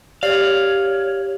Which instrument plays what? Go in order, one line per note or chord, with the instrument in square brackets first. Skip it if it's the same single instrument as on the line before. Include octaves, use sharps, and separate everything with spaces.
[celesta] G4 F#7 [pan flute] C#5 [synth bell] D5 [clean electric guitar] F5